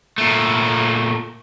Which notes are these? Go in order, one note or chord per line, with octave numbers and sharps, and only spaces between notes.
A#2 A3